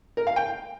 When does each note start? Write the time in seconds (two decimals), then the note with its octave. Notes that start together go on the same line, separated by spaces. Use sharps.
0.17 A#4
0.27 F5
0.36 G5